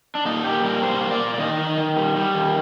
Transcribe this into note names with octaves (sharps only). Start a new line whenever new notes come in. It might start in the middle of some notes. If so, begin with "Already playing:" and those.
D4
A#2 D#4
A#2 G4
G3 A#4
A#3 C5
A#3
D5
A#2
D5
D#3 D#5
D#3
D#3
G3
G3
D#3